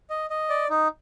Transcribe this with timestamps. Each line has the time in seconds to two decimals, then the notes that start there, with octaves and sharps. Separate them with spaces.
0.10 D#5
0.30 D#5
0.50 D5
0.70 D#4